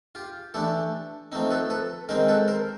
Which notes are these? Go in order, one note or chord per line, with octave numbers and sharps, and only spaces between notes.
F4 G4
E3 A3 D4 G4 A4
F3 A3 C4 D#4
A4 B4
A4 B4
D#3 G#3 C4 D#4 A#4 C5
A4 B4
A#4 C5